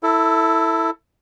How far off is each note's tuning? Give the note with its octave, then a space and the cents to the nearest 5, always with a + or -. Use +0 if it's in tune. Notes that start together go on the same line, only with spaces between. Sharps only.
E4 +0 A4 +20